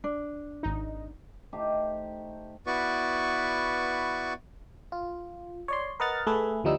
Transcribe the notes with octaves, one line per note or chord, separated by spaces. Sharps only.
D4
G#1 D#4
A3 D#4 G4 C5
B3 E4 F#4 B4 D5 C#6
F4
C#5 D5 C6
A#4 B4 D#5 F#5 F6 A6
A3 G#4 B4 E5
D2 F3 G3 D#4 E4 E6